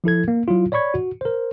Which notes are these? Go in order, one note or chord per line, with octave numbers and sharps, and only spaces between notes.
F3 E4 A4 G#6
A#3
F#3 E4 F4
C#5 D5 B5 C#6 G#6
F#4
A#4 C5